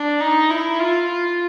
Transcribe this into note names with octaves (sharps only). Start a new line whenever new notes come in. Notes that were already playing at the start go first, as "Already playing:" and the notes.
Already playing: D4
D#4
E4
F4